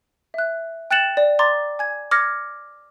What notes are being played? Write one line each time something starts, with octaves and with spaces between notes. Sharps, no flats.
E5 F#6
G5 F#6 A6 C#7 E7 F#7
D5
A#5 C6 D6 A6
G#5 G#6
D6 F6 G#6 A#6 C#7